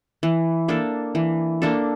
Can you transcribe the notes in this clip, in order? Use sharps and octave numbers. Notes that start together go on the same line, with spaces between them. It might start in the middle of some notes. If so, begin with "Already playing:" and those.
E3
A#3 D4 A4
E3
A#3 D4 A4